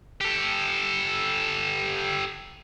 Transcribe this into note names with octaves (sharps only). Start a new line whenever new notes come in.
G4 A4